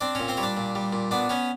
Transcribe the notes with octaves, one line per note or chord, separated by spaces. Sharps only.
C4 D4 D5
A#2 C#4 C#5
C4 C5
G3 C#5
D4 D5
A#2
G3
A#2
B3 D4 D5
B3 C#4 C#5